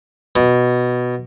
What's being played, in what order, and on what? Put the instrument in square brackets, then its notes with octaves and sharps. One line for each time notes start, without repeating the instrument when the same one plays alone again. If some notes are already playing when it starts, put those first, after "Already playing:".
[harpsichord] B2